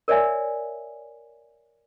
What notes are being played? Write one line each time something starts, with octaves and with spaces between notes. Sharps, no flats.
A#4 C#5 D5 E5 G#5